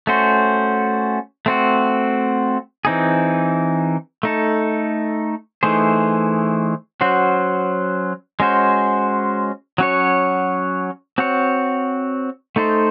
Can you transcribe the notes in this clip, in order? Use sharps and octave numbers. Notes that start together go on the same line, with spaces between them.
A3 C#4 F#4 C5
A3 C4 F#4
E3 C4 D#4 G#4
A3 D#4 A4
E3 A3 D#4 G#4 C5
F#3 C#4 F#4 C5
G#3 C#4 F#4 C5
F#3 C#4 F#4 C#5
C4 F#4 C#5
A3 D#4 A4 C5